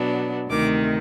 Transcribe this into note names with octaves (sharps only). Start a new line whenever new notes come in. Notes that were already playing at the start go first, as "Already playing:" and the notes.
Already playing: B2 F#3 B3 D4
D2 C3 D#3 D6